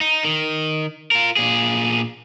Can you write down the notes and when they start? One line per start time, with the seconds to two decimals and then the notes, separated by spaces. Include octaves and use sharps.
0.01 D#4
0.25 D#3
1.11 F4 A#4
1.37 A#2 G#4